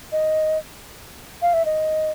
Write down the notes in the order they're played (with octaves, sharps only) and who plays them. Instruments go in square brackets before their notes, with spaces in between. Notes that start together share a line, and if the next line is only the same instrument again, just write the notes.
[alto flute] D#5
F5
E5
D#5